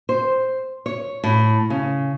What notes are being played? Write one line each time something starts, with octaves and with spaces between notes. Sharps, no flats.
C5
C#5
A2
C#3